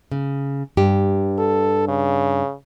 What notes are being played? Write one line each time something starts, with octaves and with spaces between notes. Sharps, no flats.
C#3
G2 G4
A4
C#3